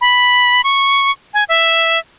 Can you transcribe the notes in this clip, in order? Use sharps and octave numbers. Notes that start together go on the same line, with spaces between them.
B5
C#6
G#5
E5